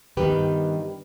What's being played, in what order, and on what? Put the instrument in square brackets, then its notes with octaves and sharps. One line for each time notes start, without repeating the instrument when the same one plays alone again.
[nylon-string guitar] G2 D#3 G3 B3 D#4 G4 B4